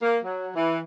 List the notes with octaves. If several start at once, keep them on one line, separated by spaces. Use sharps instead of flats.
A#3
F#3
E3